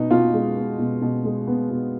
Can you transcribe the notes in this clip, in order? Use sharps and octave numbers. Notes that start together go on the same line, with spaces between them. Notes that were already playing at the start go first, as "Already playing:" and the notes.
Already playing: B2 B3 D#4
B2 F4
G#3
B3
B2
B2
G#3
B3
B2